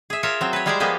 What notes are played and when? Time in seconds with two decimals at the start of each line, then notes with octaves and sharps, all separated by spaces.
0.10 G#4 E5
0.23 F4 A#4 C#5 E5
0.41 F#3 C4
0.53 B4 C#5
0.66 G3 G#3 G#4 C5 D5 G#5
0.80 F3 A#3 B3 G4 G#4